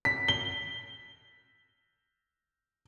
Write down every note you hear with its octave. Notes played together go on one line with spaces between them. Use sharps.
B6
G7